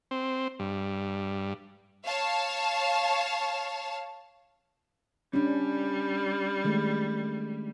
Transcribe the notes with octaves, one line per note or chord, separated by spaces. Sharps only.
C4
G2
C#5 F5 A5
G3 C#4 D4
D#3 G#3 A3